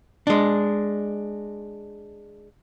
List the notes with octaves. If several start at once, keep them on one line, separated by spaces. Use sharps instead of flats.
G#3 D4